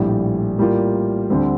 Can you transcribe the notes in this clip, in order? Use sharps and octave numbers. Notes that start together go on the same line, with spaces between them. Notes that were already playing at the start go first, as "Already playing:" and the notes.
Already playing: A#1 A2 G3
A2 G3 A#3 F4
D2 D3 G3 C4